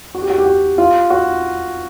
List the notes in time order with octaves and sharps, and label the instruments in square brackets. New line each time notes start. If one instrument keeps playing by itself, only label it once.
[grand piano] F#4
G4
F#4
G4
F#4
F4
F#4